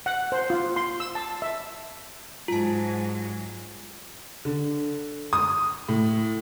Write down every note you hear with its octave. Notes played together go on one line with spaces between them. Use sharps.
F#5
C5
F4
C6
E6
A5
E5
G#2 F#3 F4 A5
D3
D#6
A2